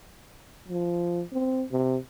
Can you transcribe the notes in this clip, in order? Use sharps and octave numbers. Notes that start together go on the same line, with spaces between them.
F3
C4
C3